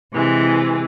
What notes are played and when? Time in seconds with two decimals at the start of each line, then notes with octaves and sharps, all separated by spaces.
0.13 C3 E3 G#3